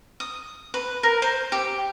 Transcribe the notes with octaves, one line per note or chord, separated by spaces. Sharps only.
D#6
B4
A#4
C5
G4